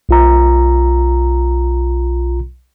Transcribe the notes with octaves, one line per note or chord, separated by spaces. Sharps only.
B1 F4 A#5